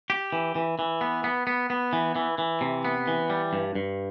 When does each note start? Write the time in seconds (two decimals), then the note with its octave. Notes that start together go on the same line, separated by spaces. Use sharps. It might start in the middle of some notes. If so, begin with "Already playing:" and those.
0.10 G4
0.32 E3
0.55 E3
0.79 E3
1.01 B3
1.24 B3
1.47 B3
1.70 B3
1.93 E3
2.16 E3
2.38 E3
2.61 C3
2.85 B3
3.08 E3
3.30 G3
3.53 G2
3.75 G2